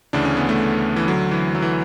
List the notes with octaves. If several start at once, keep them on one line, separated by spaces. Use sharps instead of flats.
D2 C#3 E3 D4
C#4
B3
A3
E3
D2 D3 F#3
E3
F#3
E3